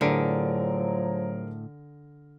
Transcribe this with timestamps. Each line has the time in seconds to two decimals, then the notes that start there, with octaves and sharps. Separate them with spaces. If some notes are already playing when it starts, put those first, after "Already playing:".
0.01 A2 D3 F3 F#3 G#4 A#4 D7